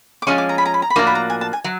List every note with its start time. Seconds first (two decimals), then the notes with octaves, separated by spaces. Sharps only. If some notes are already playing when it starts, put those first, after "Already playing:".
0.22 D6
0.27 F3 G#3 C#4 C#6
0.38 D6
0.49 A#5
0.58 B5
0.65 A#5
0.74 B5
0.82 A#5
0.90 B5
0.96 A2 F3 A#3 D4 F#4 A#5
1.07 B5
1.15 A#5
1.30 G#5
1.41 A5
1.53 G#5
1.64 F#3